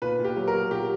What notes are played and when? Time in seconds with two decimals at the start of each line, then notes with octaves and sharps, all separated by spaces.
0.02 A#2 B4
0.19 A#2
0.24 G4
0.36 F#3
0.48 A#4
0.54 F#3
0.71 A#2 G4